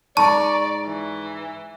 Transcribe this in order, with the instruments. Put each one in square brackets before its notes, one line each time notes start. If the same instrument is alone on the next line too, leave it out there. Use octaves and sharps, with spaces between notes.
[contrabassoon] G#2 [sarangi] D5 [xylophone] A5 [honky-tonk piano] A#5 C#6
[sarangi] E3